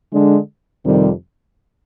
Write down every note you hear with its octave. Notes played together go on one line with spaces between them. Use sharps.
D3 G#3 D4
F2 C3 D#3 G3